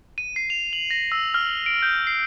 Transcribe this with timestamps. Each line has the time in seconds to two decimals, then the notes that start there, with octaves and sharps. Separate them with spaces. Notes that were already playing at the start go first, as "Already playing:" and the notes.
0.18 D#7
0.36 C7
0.50 F7
0.73 F#7
0.91 A#6
1.12 E6
1.34 F6
1.66 D7
1.82 G6
2.07 C7